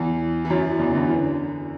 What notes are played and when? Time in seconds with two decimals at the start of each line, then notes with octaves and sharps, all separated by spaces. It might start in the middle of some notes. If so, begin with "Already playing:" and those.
Already playing: E2 E3
0.45 E3
0.50 F#2 F#3
0.79 E2 E3
0.90 D3
0.95 E2 E3
1.10 D3